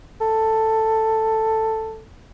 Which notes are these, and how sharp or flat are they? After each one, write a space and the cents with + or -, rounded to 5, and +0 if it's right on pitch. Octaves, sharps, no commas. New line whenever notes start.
A4 +5